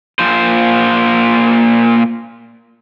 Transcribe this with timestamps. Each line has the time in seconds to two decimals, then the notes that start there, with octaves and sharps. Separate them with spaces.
0.19 A#2 C5